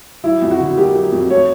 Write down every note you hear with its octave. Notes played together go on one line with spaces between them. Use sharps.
F#3 E4
F2
F#4
D3
A#3 G4
F#3
F2
A3 C#5